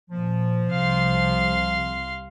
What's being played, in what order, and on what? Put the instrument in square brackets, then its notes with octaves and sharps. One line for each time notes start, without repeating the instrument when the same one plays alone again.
[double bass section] A#2 [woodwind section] F3
[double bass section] C2 C3 [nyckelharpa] F5 C6